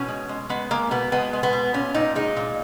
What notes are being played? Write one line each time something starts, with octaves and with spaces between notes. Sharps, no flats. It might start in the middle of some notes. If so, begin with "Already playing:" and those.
Already playing: B2 C#4
G#3
G#3
G#3 B3
G#3 A#3
B2 B3
G#3 B3
G#3
B3
B2
A#2 C#4
A#2 D#4
G#3 D#4
A#2